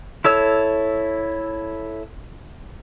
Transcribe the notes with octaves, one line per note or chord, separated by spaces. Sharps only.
E4 A4 C#5 E6